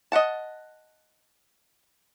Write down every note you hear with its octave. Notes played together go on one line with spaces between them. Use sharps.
D#5 E5 F#5 A5